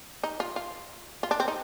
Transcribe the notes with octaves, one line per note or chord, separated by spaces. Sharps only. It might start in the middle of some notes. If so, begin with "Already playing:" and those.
D#4
F4
F4
F4
D4
C4
D#4